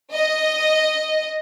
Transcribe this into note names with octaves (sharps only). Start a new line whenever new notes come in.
D#5